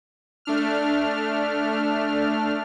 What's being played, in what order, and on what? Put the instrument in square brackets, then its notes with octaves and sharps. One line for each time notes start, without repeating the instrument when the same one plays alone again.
[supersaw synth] A3 D4 F6